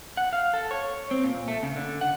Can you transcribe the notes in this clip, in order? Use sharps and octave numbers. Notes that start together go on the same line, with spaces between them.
F#5
F5
A4
C#5
C4
A#2
A3
C#3
D3
F#5